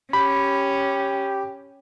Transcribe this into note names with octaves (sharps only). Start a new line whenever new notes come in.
C#4 G4 B5